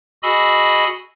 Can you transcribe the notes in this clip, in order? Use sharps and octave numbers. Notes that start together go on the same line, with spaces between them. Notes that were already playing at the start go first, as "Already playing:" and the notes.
F#4 G#4 D#5 G#5 B5 E6